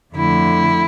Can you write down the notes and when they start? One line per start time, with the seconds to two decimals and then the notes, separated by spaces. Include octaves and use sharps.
0.14 F2 D3 A3 E4